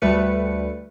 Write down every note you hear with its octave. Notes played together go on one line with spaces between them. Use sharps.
D2 G3 A3 B4 C#7